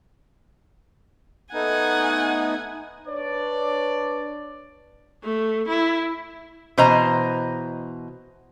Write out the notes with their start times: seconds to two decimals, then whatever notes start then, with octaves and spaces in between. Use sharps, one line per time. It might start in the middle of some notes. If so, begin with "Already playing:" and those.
1.53 A3 B3 D#4 F#5 G#5
3.07 D4 B4 C#5 D5
5.23 A3
5.68 E4
6.78 B2 E3 C5 D#5 A#5